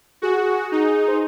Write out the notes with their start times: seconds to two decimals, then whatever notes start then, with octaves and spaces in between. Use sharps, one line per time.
0.22 F#4 G#4
0.72 D#4
1.08 C5